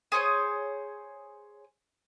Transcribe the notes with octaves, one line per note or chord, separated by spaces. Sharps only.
G#4 C5 C#5 D#6